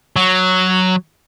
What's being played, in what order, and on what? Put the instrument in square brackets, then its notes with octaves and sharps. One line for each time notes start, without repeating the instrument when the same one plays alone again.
[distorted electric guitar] F#3